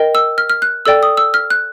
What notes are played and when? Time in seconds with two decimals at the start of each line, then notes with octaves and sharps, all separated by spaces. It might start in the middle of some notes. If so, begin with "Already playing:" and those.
Already playing: A#4 D#5 G5
0.15 E6
0.38 F6
0.50 F6
0.62 F#6
0.86 A4 D5 G5 E6
1.03 D#6
1.17 E6
1.34 F6
1.50 F#6